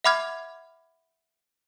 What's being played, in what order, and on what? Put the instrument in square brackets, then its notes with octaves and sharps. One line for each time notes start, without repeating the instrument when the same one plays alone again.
[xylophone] E5 F#5 B5 D6 F6 G#6